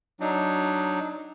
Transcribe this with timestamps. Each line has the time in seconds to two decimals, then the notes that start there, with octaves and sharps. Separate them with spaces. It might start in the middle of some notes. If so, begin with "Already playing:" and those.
0.20 F#3 D4 D#4